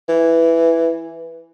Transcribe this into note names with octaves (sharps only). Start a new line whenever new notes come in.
E3